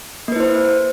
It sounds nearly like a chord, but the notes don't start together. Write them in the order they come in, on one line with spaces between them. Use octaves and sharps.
A#3 B4 E4 C5